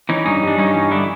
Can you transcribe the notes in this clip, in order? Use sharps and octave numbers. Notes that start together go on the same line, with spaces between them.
E3 C#4 D#4
G2 C#4 D#4
G2 D4
G2 C#4 D#4
E3
D3 D4 E4